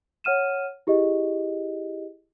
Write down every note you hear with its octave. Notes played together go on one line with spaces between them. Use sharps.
C#5 F#5 F6 D#7 E7
E4 G4 G#4 D#5